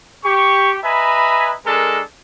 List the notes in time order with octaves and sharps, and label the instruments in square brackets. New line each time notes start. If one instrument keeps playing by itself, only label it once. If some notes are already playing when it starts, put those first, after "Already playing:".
[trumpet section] G4 C#6
B4 D#5 E5 G#5 A#5 B5
G#3 D4 A4 A#4